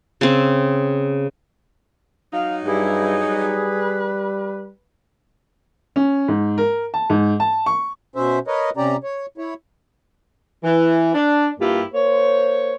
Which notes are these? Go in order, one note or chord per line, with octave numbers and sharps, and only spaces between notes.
C#3 C4
F#3 D#4 F5
G2 G3 E4 G#4
G3 B4
C#4
G#2
A#4
A5
G#2
A5
C#6
B2 C#4 C5 E5
A#4 B4 C#5 D#5
C3 C#4 G4 D5 A#5
C#5
E4 C#5
E3
D4
G2 A#3 E4 F4 G4
A#3 C5 C#5